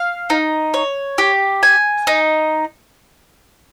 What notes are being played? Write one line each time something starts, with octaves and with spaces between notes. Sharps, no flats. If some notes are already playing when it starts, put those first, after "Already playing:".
Already playing: F5
D#4
C#5
G4
G#5
D#4